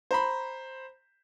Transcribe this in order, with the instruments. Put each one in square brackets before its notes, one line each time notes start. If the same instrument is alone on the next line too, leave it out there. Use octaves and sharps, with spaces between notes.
[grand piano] C5 A#5 B5